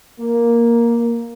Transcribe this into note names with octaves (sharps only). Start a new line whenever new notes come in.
A#3